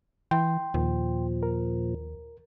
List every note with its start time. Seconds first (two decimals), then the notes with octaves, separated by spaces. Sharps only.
0.31 E3 G5 C6
0.74 D#2 A#2 F3
1.43 A#4